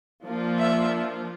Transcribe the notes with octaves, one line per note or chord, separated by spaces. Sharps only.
F3 A#3 D4 F4
E5